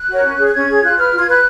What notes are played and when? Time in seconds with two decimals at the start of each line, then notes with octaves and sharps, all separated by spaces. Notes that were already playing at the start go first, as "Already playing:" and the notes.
Already playing: F#6
0.09 F#4 A#4 C#5
0.24 C#4
0.38 G#4 C#5
0.46 F#6
0.54 C#4 G#6
0.69 G#4 C#5
0.83 F4 F#6
0.98 B4 F6
1.13 F4 G#6
1.28 B4 F#6